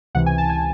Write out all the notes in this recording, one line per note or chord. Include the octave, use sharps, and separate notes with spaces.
C#2 C3 E3 F#5
G#5
A5
G#5